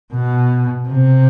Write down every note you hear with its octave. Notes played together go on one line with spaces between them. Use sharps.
B2
C3